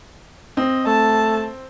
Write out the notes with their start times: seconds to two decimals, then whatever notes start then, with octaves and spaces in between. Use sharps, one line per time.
0.57 C4 D#5
0.86 A3 A5